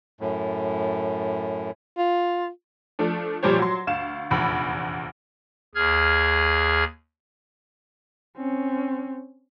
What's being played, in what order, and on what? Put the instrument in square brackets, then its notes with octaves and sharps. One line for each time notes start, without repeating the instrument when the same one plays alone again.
[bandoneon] F#2 A2
[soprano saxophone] F4
[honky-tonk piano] F3 A3 D4
A#2 F3 G3 G4 C5 C#5
F#3 C6
D2 F5 E7
F1 A#1 E2 B5
[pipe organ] D#2 G#4 F6 G#6
[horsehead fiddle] C4 C#4